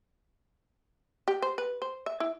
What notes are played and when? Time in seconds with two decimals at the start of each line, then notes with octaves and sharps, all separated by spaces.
1.28 G4
1.42 C5
1.58 B4
1.82 C5
2.06 E5
2.20 E4